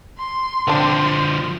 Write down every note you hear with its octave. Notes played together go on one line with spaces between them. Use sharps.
C6
D3 F3 C4 D4 C6